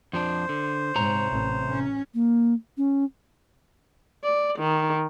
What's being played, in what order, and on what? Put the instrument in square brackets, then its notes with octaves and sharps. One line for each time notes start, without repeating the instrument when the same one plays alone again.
[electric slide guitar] F2 F3 D4 [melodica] C5
[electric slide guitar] D3
[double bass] G#2 [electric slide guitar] C3 C#5 A#5
[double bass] A1
C#4
[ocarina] A#3
C#4
[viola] D5
D#3